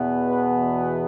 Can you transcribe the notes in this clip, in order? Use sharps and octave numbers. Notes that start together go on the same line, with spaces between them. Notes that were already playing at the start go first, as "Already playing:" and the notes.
Already playing: E2 B2 B3
B4